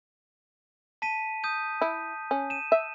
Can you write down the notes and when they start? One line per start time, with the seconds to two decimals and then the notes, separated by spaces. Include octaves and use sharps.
1.02 A5 B6 D#7
1.44 D#6 G6 D#7
1.81 E4
2.31 C#4
2.50 D#7 E7
2.72 E5